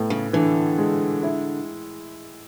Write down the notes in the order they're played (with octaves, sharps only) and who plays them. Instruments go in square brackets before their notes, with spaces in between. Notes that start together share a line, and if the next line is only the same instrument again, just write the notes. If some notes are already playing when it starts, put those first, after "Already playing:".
Already playing: [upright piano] A2 B3
[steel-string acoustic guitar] C#3
[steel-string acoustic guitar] D3 [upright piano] E3
[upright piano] G#3
E4